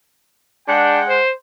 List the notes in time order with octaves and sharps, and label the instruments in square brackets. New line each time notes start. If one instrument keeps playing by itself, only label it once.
[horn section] G#3 F#5 G5 [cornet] D4
[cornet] C5